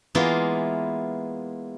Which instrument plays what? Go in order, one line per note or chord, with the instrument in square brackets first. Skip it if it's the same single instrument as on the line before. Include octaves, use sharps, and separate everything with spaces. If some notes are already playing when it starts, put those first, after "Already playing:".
[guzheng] E3 G#3 A#3 B3 E4 F4